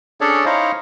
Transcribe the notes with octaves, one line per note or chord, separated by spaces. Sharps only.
C#4 D4 G#4 A4 C#5 D5
D#4 E4 C5 C#5 D#5 F5